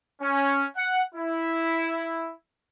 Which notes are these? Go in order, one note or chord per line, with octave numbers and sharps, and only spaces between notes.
C#4
F#5
E4